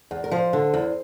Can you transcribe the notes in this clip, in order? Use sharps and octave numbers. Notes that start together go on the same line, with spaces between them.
E2
A#4
F3 C5
D3
E2